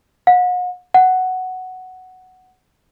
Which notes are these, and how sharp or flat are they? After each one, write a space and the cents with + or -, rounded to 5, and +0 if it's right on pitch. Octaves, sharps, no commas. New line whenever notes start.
F#5 -40
F#5 +5